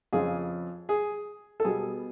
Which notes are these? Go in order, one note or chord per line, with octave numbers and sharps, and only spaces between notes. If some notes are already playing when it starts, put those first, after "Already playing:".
F2 C#3 F3 G#4
G#4
A4
B2 G3 B3 G#4